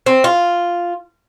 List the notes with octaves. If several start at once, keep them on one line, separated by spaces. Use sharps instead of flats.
C4
F4